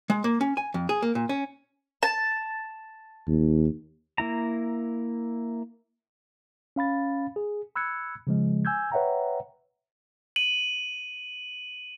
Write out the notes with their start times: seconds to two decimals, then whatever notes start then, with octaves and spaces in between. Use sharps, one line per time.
0.10 G#3
0.24 A#3
0.41 C#4
0.57 G#5
0.74 F2
0.89 G#4
1.02 A#3
1.15 A#2
1.29 C#4
2.03 A5
3.28 D#2
4.18 A#3 E4 A#5
6.76 C#4 F5 B5 A6
7.36 G#4
7.76 B5 E6 F#6 G#6 C#7
8.27 C#3 F3 G#3
8.65 G#5 E6 G6 G#6
8.92 B4 C#5 E5 F#5 G5 A#5
10.36 D#7 F#7